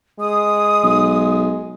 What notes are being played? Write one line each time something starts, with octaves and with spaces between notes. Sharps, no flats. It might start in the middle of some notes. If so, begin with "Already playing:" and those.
G#3 D#6
B1